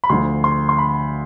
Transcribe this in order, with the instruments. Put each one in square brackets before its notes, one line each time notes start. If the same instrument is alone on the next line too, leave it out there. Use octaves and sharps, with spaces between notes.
[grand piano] B5
D2 D3 F3 C6
C6
C6
B5